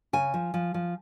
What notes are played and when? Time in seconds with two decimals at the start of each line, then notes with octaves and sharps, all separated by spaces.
0.13 C#3 G#5
0.34 F3
0.54 F3
0.74 F3